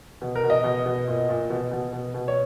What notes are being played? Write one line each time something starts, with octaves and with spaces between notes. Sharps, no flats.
B2
A#4
B2
D#5
B2
B2
A#2
A#2
B2
B2
B2
B2
C#5